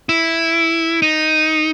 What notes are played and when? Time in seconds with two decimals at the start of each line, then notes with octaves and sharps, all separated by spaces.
0.09 E4
1.02 D#4